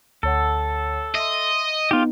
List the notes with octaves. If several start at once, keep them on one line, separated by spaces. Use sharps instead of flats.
D2 A4 C#5 F#5
D#5 E5 C6
B3 D#4 F4 G4